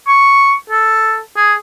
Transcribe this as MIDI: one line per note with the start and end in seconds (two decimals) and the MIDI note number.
0.07 0.54 85
0.70 1.19 69
1.36 1.53 68